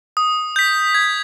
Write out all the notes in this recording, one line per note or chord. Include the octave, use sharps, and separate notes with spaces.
D#6
G6 B6
G#6